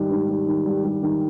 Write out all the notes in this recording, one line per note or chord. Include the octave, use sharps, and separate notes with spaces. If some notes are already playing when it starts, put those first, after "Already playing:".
Already playing: G#2 D#3 G3
G#2
G3
D#3
G3
G3
D#3